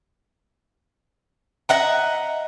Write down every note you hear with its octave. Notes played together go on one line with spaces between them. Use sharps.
D#5 E5 F#5 A#5